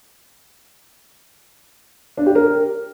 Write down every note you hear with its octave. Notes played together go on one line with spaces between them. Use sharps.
D4
G4
A#4